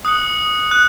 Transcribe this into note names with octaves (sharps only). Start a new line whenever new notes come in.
D#6 F#6 C#7 F#7
F#6